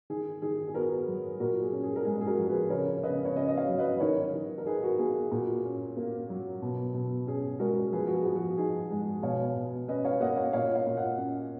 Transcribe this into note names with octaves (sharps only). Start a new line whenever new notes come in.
D#3 G#4
D#3 G#4
G#4
B3 F#4 A#4
F#3
A#2 F#4 A#4
G#4
C#4
G#4
A#4
G#3 G#4
G#4
F#4 A#4
F3
G#4 B4
C#3 A#4 C#5
C#3 B4 D#5
C#5
C#4 B4 D#5
D#5
C#5 F5
F#3
B4 D#5
D#3 A#4 C#5
D#3
A#4
D#4 G#4 B4
F#4 A#4
A#3 G#4
G#4
A#2 F#4
C#4
A#3
F#3
B2
B2
C#4 G#4
G#3 F#4 A#4
F3 G#4 B4
F#4
G#4
F3
F#4
D#4 G#4
G#3
B2 C#5 F5
B2
C#4 B4 D#5
C#5 F5
A#3 D#5 F#5
C#5 F5
A#2 C#5 F5
C#5 F5
A#2
D#5 F#5
C#4